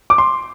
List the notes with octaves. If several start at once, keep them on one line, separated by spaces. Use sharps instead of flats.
D6
C6